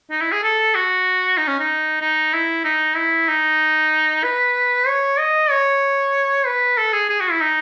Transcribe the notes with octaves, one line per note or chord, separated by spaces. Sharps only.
D#4
E4
G#4
A4
F#4
D#4
C#4
D#4
D#4
E4
D#4
E4
D#4
B4
C#5
D#5
C#5
B4
A4
G#4
G#4
F#4
E4
D#4